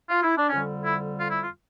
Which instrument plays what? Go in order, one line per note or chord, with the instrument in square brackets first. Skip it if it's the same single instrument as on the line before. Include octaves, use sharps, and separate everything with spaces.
[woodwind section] F4
E4
D4
F2 D3 G3 C#4
E4
F4
E4
F4